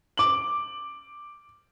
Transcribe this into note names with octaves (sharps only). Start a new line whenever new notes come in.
D6 F#7